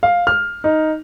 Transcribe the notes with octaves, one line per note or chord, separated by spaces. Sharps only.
F5
F6
D#4